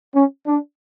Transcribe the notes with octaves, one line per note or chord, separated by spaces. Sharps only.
C#4
D4